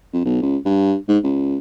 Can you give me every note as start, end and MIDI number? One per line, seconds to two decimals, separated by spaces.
0.13 0.22 41
0.25 0.39 35
0.42 0.57 37
0.65 0.95 43
1.08 1.18 44
1.23 1.58 37